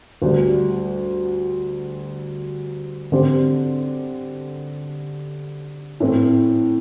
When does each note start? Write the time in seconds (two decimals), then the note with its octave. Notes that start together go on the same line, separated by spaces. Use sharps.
0.22 D2 D3 G3
3.12 D3 C4 G4 C5
6.00 A2 E3 A3 C4